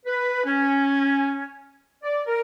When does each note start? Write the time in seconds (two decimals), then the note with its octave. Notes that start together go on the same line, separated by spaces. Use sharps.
0.06 B4
0.45 C#4
2.03 D5
2.26 A#4